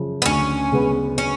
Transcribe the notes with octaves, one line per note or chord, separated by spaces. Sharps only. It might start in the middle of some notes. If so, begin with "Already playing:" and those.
Already playing: F#2 C#3 F3
B3
D2 C#4
C#3 G#3 B3
C#4